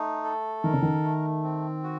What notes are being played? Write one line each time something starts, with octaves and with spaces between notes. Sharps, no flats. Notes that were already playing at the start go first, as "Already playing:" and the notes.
Already playing: A3 D#4
A4
D#3 A#4
C#3
D#3
A3
C4
F#4